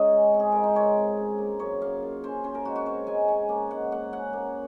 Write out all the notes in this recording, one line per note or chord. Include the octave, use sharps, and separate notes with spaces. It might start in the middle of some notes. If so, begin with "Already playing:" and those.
Already playing: G#2 C#4 D#4 F4 C#5 D#5 F5
G#3
C4
G#4
G#3 A#4
C5
D#4 C#5
C4
C#3
A#3
F#2 C#5
A#3 F5
F4
C#4 C5
C#4 C5
A#4
G#3 F#4
F#4
C4 C#5
G#3 G#5
C#4 G#5
A#3
G#2 F#5
A#3 F#5
C#4 F#5
A#3